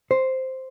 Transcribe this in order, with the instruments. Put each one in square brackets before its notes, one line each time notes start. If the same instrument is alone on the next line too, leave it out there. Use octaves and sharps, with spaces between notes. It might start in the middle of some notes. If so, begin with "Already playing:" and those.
[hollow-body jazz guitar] C5